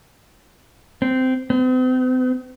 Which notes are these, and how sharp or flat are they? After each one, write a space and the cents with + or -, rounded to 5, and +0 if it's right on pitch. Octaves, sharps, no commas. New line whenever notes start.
C4 -15
C4 -45